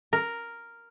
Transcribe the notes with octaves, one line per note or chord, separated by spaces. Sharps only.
A#4